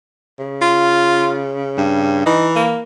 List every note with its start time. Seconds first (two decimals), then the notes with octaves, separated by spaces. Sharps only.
0.39 C#3
0.62 F4
1.78 G2
2.26 E3 D#4
2.56 A#3